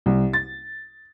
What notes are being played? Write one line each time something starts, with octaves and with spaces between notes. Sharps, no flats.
C2
A6